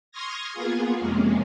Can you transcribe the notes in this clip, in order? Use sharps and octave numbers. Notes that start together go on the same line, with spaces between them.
C6 C#6 D#6 F6 G#6 A#6
A#3 B3 F4 G#4
F2 C3 G#3 A#3 C#4